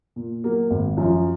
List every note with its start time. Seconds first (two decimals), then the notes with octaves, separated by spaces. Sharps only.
0.16 A#2
0.44 F#3 A#3
0.71 G#1
0.97 F#2 F3